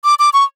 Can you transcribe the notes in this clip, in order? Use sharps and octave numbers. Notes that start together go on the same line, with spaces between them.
D6
D6
C#6